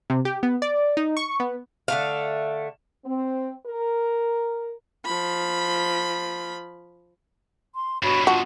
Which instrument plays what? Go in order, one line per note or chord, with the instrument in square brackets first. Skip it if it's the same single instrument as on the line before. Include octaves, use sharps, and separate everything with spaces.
[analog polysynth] C3
G4
B3
D5
D#4
C#6
B3
[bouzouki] D3 A3 F5
[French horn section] C4
A#4
[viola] F3 B5
[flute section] C6
[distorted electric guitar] G2 B2 [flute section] F#4 C#5 B5
[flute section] F4 A5 [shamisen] F#4